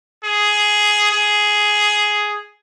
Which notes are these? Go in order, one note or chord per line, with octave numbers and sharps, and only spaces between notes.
G#4
G#4